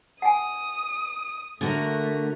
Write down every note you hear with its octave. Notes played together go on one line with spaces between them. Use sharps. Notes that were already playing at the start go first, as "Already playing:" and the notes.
F#5 G#5 D#6
D3 A3 F#4 A#4